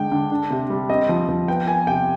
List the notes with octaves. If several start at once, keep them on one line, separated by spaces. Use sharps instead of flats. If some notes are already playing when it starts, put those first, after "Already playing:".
Already playing: D3 G#3 G5
D3
D4
C3
G3
C4 D#5
F3
F3
B3 G5
B3 G#5
C3 G5